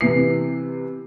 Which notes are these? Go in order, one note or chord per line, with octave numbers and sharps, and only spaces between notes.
C3 E3 C7